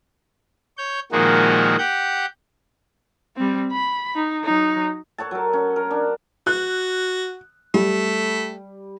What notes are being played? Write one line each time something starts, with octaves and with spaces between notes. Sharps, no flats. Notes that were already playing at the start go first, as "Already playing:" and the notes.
C#5 G6
A#2 D#3 F3 G#3 A#3 F#4
G4 F#5 G6
G3 C4
B5
D#4
F#3 D#4
A4 C#5 F#5 A5
F#3 A#4
C#4
A#4
D4
F#4 F#6
G3 A3